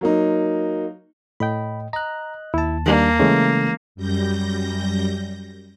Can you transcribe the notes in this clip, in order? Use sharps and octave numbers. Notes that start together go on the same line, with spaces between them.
F#3 A#3 D#4
A2 D#5 G5 B5
D#5 A#5 F#6
D#2 E4 A5
D#3 G3 A#3 D4
C#3 E3 G#3 A3 C#4 A4
F#2 G3 G6 A#6